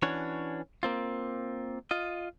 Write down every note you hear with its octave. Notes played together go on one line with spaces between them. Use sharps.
E3 C#4 D4 F#4 C#5
A#3 C4 F4
F4 D#5